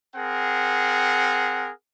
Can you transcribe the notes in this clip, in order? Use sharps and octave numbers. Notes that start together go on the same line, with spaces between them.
C4 G#4 A#4 F#5